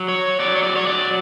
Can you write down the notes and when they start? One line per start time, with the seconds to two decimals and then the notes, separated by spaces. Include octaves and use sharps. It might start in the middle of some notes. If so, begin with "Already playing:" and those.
Already playing: F#3
0.08 C#5
0.40 F#3 D5
0.55 C#5
0.63 D5
0.76 C#5
0.87 F#3 D5